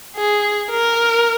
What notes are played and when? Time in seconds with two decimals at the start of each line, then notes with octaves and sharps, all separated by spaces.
0.16 G#4
0.71 A#4